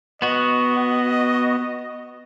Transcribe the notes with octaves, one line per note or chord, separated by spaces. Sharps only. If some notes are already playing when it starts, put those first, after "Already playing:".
B3 F#4 D#5